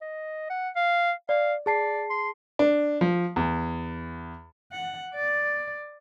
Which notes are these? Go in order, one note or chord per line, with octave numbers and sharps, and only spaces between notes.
D#5
F#5
F5
D5 F5
G#4 D5 A5 C7
C6
D4
F3
E2
F#5
D5